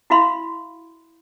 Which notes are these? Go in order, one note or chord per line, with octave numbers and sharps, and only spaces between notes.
E4 F#4 E5 F5 B5 C6